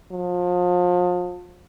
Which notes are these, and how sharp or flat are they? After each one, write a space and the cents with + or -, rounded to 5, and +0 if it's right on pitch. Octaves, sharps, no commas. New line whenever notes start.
F3 +35